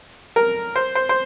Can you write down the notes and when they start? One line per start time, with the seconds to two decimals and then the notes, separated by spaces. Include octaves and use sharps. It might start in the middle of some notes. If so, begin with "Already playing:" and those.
0.36 A#4
0.76 C5
0.95 C5
1.09 C5